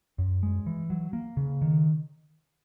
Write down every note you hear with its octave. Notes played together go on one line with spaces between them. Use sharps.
F#2
G#3
E3
F#3
A#3
C#3
D#3